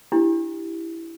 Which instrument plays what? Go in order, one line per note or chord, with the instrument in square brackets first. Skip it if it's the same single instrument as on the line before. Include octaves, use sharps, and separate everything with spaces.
[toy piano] D4 E4 G4